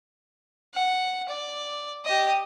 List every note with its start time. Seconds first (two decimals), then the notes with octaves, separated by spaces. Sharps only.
0.74 F#5
1.29 D5
2.05 G4 D#5